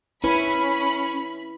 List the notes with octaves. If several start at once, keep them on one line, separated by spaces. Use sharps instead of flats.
C#4 E4 B4 B5